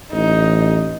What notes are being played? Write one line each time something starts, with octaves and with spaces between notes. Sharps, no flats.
A1 D#4